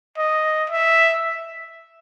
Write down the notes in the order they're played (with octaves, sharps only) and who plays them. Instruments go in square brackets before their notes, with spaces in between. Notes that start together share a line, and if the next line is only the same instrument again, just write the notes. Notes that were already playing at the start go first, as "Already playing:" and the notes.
[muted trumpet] D#5
E5